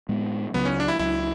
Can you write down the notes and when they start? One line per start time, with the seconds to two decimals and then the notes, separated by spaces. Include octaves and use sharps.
0.09 A2 G#3 B3
0.54 C#2 C#3 F#3 B3
0.65 C#4
0.80 D4
0.88 E4
0.99 C#2 C#3 F#3 E4